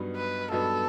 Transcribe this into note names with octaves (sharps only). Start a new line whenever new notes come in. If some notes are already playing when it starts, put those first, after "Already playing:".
Already playing: G2 F#3 B3 D#4
B4
G2 F#3 B3 D#4 A4